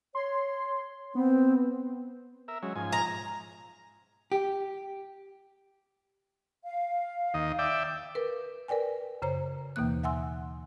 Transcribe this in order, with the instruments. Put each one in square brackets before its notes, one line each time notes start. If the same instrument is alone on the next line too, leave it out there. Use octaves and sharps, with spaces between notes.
[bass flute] C#5 [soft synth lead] C6
[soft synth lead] B3 [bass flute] C4
[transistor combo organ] A#4 E5
F#3 G#3 C#4
G#2 F3 G#5
[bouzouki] A#5
[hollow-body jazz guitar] G4
[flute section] F5
[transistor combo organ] D#2 D#5
D5 E5 G5
[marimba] A#4 B4
A#4 B4 D5 G5 G#5
F#2 C#3 C5 C#5 A#5
D#2 B2 E3 A#3 F#6
E5 F#5 G#5 C6 E6